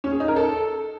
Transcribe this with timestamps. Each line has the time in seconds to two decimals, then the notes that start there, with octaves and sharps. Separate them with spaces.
0.04 C#4
0.12 G#4
0.20 D#4
0.28 A#4
0.36 A4